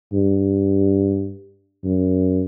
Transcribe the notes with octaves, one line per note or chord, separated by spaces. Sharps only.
G2
F#2